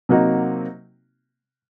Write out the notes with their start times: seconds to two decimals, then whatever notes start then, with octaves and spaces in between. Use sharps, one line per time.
0.09 C3 F#3 A#3 D#4 F#4